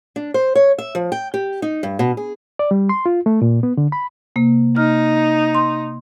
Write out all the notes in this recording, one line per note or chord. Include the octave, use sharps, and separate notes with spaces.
D4
C5
C#5
E5
F3
G5
G4
D#4
G2
B2
G#4
D5
G3
C6
F4
A3
A#2
B3
D3
B5
C3 A#3
D#4 F6
C6